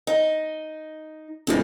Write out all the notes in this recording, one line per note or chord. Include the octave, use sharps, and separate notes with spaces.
D#4
E1 F2 A2 C#3